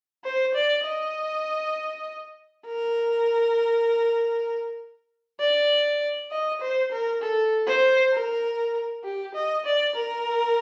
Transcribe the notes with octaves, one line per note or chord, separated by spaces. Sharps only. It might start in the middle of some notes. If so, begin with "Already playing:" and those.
C5
D5
D#5
A#4
D5
D#5
C5
A#4
A4
C5
A#4
G4
D#5
D5
A#4